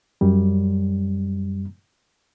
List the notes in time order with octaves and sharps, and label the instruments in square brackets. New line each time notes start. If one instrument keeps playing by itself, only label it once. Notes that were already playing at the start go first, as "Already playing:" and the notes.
[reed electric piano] F#2 G3